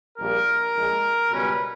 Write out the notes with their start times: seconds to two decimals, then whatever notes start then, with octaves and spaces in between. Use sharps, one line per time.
0.18 A#1 A#2 G3 A#4
0.74 A#1 A#2 G#3
1.30 C#2 B2 G3 C#4 B4